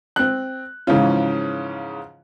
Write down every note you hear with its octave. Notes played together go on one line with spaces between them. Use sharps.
C4 F#6
G#2 C#3 E3 F3 C#4 F4